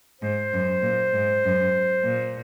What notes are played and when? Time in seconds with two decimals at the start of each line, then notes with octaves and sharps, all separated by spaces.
0.21 G#2 C5
0.53 F#2
0.83 A#2
1.13 G#2
1.44 F#2
2.05 A#2